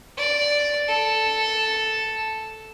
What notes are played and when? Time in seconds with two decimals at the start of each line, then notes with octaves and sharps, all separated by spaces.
0.18 D5
0.88 A4